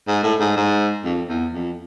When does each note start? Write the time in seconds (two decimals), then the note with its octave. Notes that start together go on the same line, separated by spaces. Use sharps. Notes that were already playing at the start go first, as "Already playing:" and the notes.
0.08 G#2
0.23 A2
0.40 G#2
0.57 G#2
1.04 F2
1.29 E2
1.54 F2